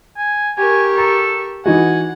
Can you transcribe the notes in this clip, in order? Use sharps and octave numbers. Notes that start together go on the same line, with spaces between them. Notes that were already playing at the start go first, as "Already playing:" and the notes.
G#5
G4 A#4 G#5 C#6
A4 A#5
E3 D#4 F#4 F#5 G#5